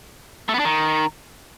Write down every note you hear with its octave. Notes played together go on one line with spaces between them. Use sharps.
A3
B3
D4
D#3